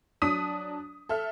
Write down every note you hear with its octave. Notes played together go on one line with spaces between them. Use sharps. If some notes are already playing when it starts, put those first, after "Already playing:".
F#3 D4 D#6 B6 D#7
A4 E5 F6